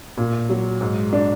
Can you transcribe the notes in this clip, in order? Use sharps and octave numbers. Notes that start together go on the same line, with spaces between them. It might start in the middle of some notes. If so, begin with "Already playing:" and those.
A#2
F#3
G#2
D4